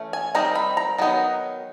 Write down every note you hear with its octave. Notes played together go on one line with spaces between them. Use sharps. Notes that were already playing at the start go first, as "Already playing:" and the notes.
Already playing: E3 A3 C#4
G#5
D#3 G3 C4 D#4 A#5
B5
A#5
D#3 F#3 B3 D#4